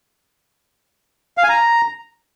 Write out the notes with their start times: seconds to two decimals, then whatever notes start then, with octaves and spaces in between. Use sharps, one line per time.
1.38 F5
1.43 G#5
1.49 A#5